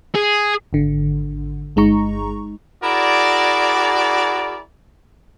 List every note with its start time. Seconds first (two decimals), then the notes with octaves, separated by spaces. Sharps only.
0.15 G#4
0.73 G#1 D3
1.76 G1 G#3 D#4 A#5 C#6
2.83 E4 F#4 G#4 A#4 D5